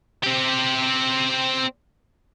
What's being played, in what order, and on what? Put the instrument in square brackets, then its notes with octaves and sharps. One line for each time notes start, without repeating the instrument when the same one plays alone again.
[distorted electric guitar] C4 G4